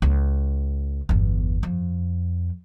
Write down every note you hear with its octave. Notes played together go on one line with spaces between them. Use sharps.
C#2
G1 E2
F2